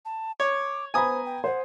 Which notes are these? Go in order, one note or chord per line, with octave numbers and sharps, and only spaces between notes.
A5
C#5 D6
B3 C5 G#5 A#5 B5 D#6
G5
C5 F#5